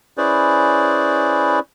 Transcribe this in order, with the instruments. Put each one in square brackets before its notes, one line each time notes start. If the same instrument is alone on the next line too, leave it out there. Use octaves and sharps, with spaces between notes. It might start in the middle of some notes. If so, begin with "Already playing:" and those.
[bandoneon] C#4 E4 G#4 B4 C5 D5